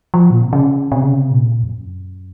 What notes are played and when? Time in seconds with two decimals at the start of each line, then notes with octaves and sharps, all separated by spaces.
0.14 F3
0.30 A#2
0.42 C3
0.53 C#3
0.92 C3
1.02 C#3
1.13 C3
1.31 A#2
1.63 F2
1.69 F#2